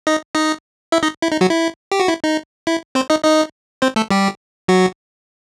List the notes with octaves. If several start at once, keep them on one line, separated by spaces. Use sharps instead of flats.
D#4 D#5
D#4 D#5
E4 E5
D#4 D#5
E4
D#4
F#3 F#4
E4
G4
F#4
E4
D#4
E4
C4 C5
D#4 D#5
D#4 D#5
C4 C5
A3 A4
G3 G4
F#3 F#4